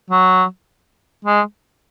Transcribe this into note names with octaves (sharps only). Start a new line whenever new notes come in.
F#3
G#3